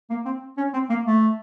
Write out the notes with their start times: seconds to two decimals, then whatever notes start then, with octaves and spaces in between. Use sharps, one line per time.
0.10 A#3
0.25 C4
0.58 C#4
0.73 C4
0.90 A#3
1.06 A3